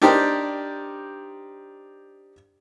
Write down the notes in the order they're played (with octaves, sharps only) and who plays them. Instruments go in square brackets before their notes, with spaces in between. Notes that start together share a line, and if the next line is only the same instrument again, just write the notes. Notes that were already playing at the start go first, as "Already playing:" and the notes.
[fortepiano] D4 D#4 G4 A#4 C5 D5